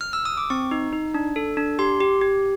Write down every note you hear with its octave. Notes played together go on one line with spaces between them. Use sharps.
F6
E6
D#6
D6
C4 C#6
D#4
D#4
D4
A4
D4
G4 C6
G4
G4